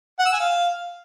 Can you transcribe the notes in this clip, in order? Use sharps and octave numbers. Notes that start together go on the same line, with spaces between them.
F#5
E6
G#5
F5